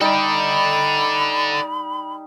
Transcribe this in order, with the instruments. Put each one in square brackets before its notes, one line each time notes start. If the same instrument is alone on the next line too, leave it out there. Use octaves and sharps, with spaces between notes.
[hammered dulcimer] G3 D#4 [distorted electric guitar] A4 D5 [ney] B5